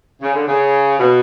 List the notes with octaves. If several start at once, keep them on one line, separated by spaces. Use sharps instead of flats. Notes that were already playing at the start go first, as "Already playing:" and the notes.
C#3
D3
C#3
B2